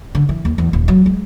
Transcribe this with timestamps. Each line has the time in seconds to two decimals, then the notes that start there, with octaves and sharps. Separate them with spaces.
0.15 D3
0.29 E3
0.45 D#2
0.58 E2
0.73 D#1
0.88 F#3
1.06 G#3